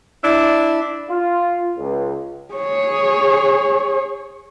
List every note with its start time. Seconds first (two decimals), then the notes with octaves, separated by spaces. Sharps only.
0.24 D4 E4
1.11 F4
1.78 C#2
2.54 G#4 C#5